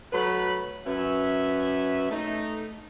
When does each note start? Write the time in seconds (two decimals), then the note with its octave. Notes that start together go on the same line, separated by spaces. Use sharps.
0.13 F#3 A3 B4 B5
0.86 F#2 C#4 B4 E5
2.10 A3 D#4